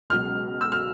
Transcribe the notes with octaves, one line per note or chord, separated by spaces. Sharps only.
C#2 B2 F#3 F6
E6
F6